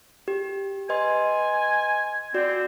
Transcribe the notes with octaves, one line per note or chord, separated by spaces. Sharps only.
G4
B4 D#5 G#5 C6
C4 F#4 D5